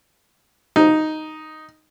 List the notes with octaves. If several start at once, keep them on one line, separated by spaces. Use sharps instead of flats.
D#4